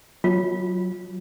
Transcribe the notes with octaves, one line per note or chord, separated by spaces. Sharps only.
F#3 F4